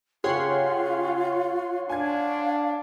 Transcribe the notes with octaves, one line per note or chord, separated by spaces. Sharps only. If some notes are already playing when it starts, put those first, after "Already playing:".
C#3 F4 G4 G#4 C#5 F#5 C6
D4 F5 G#5 G#6